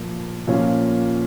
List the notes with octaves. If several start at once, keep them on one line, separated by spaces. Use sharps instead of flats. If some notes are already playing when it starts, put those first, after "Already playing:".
Already playing: A#2 F3 A#3
A#2 F3 A#3 C#4 F4